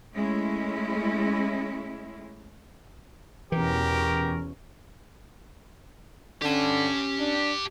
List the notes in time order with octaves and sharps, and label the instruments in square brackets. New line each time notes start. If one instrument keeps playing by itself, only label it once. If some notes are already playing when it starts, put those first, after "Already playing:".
[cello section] G#3 A3 C#4 E4
[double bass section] E2 B2 C#4 [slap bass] E3 [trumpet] G4 [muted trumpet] A#4
[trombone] D3 [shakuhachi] C#4 [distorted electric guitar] G4 A5
[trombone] D4